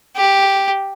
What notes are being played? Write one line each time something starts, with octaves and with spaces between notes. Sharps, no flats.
G4